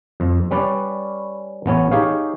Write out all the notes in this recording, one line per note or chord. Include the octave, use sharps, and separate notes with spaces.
F2
G3 C#4 B4 D5
A1 B3 C#4 C#5
D#4 G4 G#4 C#5 F5